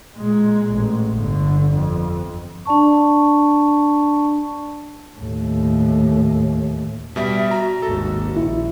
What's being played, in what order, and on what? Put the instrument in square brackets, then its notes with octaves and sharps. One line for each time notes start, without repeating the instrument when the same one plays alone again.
[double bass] A#2 G#3
A1
G1 D3
F2
[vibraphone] D4 D5 A5 C#6
[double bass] D#2 A2
[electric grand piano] B2 G3 [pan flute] E5
[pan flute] F#4 [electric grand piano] A#5
[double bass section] G#1 D#2 [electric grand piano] A4
[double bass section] A#1 [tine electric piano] E4